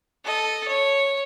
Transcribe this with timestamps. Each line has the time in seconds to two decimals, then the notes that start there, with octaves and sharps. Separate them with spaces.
0.24 A4 D#5
0.68 C#5